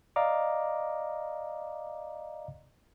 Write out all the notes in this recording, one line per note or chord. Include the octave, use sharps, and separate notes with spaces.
D5 D#5 F5 A#5 D6